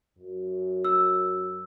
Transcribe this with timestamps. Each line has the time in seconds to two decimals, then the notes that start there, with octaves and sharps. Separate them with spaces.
0.19 F#2
0.85 E6